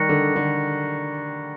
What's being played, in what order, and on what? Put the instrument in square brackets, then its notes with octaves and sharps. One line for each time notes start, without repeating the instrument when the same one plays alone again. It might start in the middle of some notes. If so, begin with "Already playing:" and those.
Already playing: [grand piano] D#3 G3 [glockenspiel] A#5 C#6 F#6 A#6 C#7
[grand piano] D3
D3